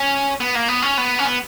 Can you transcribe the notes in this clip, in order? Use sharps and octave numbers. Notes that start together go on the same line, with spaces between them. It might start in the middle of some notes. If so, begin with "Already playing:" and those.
Already playing: C#4
B3
A#3
B3
C#4
B3
C#4
B3